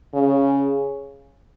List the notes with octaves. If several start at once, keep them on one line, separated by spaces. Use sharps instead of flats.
C#3